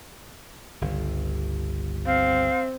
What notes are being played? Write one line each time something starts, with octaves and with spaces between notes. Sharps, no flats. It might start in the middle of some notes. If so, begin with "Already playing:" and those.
G1 C#2
C4 F5